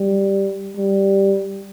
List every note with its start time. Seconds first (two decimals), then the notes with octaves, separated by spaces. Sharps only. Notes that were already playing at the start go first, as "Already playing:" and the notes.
Already playing: G3
0.77 G3